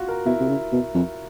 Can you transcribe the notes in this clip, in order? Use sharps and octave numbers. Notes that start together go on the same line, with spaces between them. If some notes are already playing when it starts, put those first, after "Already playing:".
Already playing: F4 F#4
A#4
B2 E4
C3
C#3
B2
F2